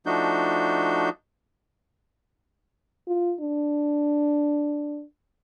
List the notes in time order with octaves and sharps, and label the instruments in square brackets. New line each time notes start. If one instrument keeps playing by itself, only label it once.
[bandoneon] F3 A3 D4 D#4 F#4 G6
[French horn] F4
D4